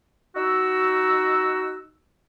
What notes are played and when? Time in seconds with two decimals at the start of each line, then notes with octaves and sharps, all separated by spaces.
0.36 D#4 F#4 E6